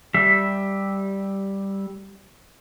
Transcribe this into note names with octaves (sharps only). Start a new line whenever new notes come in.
G3 E5